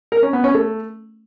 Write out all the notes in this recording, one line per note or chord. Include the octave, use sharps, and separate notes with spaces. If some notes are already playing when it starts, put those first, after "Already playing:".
A#4
C#4
B3
C#4
A3